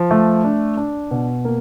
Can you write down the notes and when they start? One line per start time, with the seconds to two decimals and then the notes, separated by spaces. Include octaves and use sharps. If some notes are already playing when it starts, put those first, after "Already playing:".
Already playing: F3
0.11 A3
0.44 D4
0.77 D4
1.11 B2
1.45 A#3